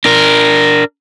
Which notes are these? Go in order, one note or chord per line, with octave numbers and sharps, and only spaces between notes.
D4 A#4